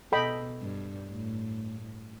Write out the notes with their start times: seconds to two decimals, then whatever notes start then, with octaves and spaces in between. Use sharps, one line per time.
0.12 B2 A4 D#5 G5 B5
0.61 G2
1.10 A2